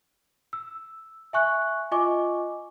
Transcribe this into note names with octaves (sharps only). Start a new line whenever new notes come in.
E6
E5 G#5 C#6 F#6
F4 D#5 G#5 C#6 D6